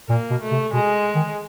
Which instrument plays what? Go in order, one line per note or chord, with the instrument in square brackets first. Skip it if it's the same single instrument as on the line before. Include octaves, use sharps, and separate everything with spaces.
[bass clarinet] A#2 [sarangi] A#3
[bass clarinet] B2
[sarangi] A3
[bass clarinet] C3
[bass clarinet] B2 [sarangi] G#3
[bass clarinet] D#3